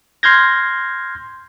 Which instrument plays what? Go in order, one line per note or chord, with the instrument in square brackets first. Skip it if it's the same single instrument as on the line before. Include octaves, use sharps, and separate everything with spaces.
[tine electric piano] C6 F6 G6 G#6 A#6